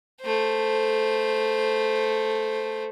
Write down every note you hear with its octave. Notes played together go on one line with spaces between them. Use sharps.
A3 C5